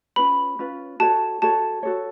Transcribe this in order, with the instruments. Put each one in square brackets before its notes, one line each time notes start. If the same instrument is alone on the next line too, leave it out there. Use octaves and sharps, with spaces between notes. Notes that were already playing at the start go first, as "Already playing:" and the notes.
[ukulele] C#4 F4 B4 [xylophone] B5
[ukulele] C#4 F4 B4
[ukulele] F#4 A4 C#5 [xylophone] A5
[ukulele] F#4 A4 C#5 [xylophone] A5
[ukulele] F#4 A4 C#5